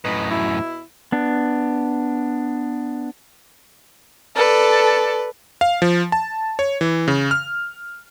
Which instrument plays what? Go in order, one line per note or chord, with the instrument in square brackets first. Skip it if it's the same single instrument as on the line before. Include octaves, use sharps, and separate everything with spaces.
[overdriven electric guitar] F#2 A2 [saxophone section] B4 D#5
[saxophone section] B2 E4
[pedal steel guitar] B3 D4
[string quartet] A4 D5 [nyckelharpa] B4
[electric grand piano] F5
F3
A5
C#5
E3
C#3
F6